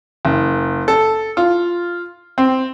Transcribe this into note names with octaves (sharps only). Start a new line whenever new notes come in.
F#1
A4
F4
C4